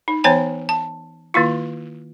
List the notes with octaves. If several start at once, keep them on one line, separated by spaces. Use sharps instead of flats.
D#4
E3 B3 C5 C#5 G#5 A#5
A5
D#3 A#3 E4 F4